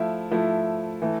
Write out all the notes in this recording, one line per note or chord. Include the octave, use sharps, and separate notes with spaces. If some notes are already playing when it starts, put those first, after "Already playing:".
Already playing: F3 A3 E4
F3 A3 E4
E3 A3